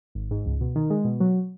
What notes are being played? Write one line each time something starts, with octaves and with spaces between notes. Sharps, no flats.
G#1
G#2
C#2
B2
D#3
G#3
B2
F#3